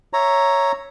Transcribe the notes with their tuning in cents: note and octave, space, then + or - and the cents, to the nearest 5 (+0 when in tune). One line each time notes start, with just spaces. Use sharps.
C#5 +0 E5 +0 A#5 +0